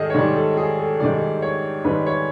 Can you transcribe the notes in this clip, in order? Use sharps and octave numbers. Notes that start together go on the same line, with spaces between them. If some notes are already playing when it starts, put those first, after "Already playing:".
Already playing: G#2 D#3 G3 G#4 A4 D#5
C#5
G#2 D#3 G3 D5
A4
G#4
A4
G#2 D#3 G3 D5
C#5
G#2 D#3 G3 B4
C#5